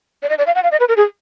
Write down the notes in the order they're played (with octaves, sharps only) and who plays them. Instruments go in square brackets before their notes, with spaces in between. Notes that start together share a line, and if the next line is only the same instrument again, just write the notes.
[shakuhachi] D5
D#5
D5
F5
F#5
F5
D#5
B4
A#4
G#4